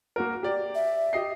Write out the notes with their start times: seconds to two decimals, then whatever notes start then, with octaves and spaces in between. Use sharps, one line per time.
0.16 A#3 F#4 A#4
0.43 G4 D5
0.75 E5
1.13 G4 D#5 C7